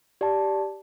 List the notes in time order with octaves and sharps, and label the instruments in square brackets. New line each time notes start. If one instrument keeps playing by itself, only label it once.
[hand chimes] G4 D5 A5